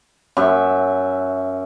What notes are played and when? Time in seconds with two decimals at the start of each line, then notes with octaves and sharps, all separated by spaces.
0.37 F#2 E5